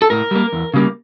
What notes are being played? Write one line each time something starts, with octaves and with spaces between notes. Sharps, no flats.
A4
A2 A#4
G3 A#3
E2
C#3 G3 A#3